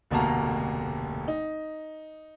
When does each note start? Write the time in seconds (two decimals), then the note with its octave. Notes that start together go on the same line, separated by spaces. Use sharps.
0.11 F1 D2 B2 A#3 A5 A#5
1.28 D#4